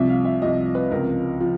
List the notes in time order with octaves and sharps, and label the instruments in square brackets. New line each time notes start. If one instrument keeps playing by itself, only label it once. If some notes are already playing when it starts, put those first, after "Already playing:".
Already playing: [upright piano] C2 C3 F3 E5
F5
E5
C2 C3 F3 D#5
B4
C#2 C3 F3 A#4
F3